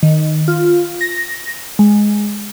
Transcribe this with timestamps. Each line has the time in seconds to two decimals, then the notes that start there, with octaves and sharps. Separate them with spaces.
0.03 D#3
0.48 F4
1.01 A#6
1.79 G#3